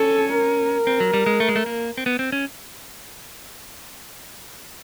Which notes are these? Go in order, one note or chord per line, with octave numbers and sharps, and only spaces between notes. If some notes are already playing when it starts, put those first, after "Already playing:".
Already playing: C#4 A4
A#4
C4
F#3
G3
G#3
A3
G#3
A3
A#3
C4
B3
C4
C#4